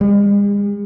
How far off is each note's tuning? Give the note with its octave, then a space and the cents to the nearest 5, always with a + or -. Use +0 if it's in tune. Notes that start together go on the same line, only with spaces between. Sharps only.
G#3 -45